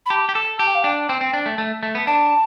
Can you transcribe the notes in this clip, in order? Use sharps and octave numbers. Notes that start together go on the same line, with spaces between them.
B5
G4 A5
G4
A4
G4 A5
G5
F5
D4 G5
C4 G5
C4
D4
A3
A3
A3
B3
D4 A5